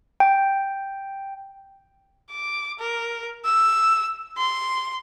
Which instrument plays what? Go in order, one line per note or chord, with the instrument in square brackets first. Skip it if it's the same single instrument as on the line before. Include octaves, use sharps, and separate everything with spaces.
[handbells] G5
[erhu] D6
A#4
E6
C6